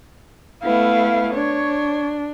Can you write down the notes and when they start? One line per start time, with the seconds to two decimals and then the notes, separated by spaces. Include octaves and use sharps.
0.63 A3 B3 E4 F5
1.34 D4 C#5